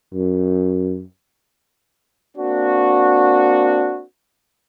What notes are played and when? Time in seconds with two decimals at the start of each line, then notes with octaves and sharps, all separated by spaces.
0.14 F#2
2.37 A#3 C4 D4 F#4